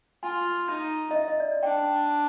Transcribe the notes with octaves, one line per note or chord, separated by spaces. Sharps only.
F4 G#5
D#4
D#5
E5
D#5
D5
D5
D4 G5